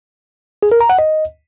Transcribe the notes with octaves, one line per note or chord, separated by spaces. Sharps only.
G#4
A#4
A#5
F#5
D#5